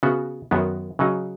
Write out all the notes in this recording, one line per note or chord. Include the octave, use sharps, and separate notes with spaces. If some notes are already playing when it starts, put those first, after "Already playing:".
C#3 B3 F#4
F#2 D#3 B3 F#4
C#3 F#3 D#4